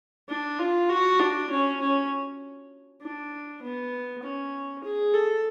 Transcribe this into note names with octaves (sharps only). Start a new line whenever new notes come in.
D4
F4
F#4
D4
C#4
C#4
D4
B3
C#4
G#4
A4